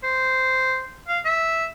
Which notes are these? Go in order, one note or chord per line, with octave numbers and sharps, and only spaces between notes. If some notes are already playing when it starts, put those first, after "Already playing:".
C5
F5
E5